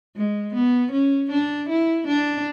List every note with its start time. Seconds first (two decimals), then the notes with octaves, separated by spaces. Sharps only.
0.16 G#3
0.54 B3
0.92 C#4
1.31 D4
1.69 E4
2.07 D4